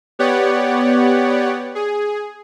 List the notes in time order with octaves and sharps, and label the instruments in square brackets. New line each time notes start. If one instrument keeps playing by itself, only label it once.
[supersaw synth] B3 G4 C#5 D5 F#5
G#4